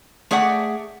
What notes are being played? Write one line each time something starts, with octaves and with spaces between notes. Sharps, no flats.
A3 G#4 D5 E5 F#5